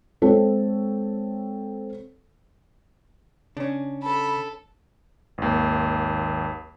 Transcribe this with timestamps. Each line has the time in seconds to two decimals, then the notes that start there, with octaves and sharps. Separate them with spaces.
0.22 G#3 C4 A4 C#5
3.57 C#3 C#4 D4
4.03 A4 B5
5.38 G#1 D#2